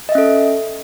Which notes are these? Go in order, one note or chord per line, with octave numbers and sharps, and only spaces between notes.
C#4 A4 D#5 E5